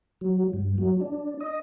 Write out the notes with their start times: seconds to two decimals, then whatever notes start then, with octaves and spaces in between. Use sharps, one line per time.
0.21 F#3
0.53 G2
0.78 F#3
1.01 D4
1.41 D#5